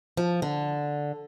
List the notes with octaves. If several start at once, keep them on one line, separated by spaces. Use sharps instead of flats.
F3
D3